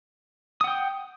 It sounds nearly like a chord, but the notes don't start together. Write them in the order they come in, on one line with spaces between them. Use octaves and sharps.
D#6 F#5 G5